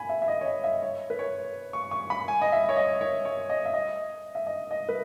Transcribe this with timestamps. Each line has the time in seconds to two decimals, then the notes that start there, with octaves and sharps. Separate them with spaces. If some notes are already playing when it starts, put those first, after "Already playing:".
Already playing: G#5 B5
0.09 E5
0.22 E5
0.28 D#5
0.41 C#5
0.46 D#5
0.64 E5
0.74 D#5
0.82 C#5
1.10 B4
1.19 C#5
1.73 C#6
1.91 C#6
2.10 B5
2.28 G#5
2.42 D#5
2.52 E5
2.69 C#5
2.76 D#5
3.01 C#5
3.25 C#5
3.49 D#5
3.65 E5
3.74 D#5
4.35 E5
4.47 D#5
4.71 D#5
4.89 B4